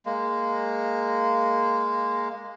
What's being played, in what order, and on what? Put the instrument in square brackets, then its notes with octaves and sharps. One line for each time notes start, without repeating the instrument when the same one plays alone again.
[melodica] G#3 A#3